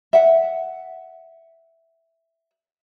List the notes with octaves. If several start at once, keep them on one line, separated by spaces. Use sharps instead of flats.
E5 F#5